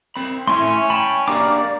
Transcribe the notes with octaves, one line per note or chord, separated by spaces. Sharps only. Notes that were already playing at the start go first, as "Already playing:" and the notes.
C4 B5
A3 C#4 E4 E5 G#5 C6
G5 A5 B5
A#3 D4 G4 A#4 D5 D6